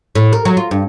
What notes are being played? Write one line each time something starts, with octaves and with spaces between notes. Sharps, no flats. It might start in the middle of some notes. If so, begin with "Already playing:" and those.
A2
A#4
F#3
F4
G2